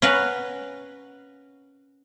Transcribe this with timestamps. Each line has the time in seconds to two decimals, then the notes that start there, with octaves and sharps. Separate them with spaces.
0.02 C#4 A#4 B4 F5 F#5